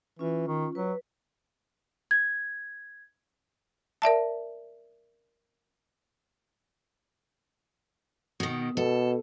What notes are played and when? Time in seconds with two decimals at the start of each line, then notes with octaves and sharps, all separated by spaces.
0.19 E3 C#4 F4
0.48 D#3
0.75 F#3 B4
2.11 G#6
4.02 A#4 D5 E5 A5
8.40 B2 D#3
8.77 B2 A4